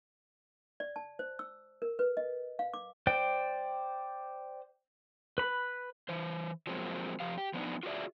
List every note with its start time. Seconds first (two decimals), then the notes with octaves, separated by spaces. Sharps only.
0.80 D5
0.96 A5
1.19 C5
1.39 E6
1.82 A#4
1.99 B4
2.17 D#5
2.59 F5
2.74 D6
3.07 C5 D5 G5
5.38 B4 B5
6.09 E3 C5
6.67 F3 F#3 G#3 A#3 C4
7.20 F2 F3 G4 F5
7.38 G4
7.53 F3 B3 D4 D#4
7.83 F4 F#4 G#4 A#4 D5 E5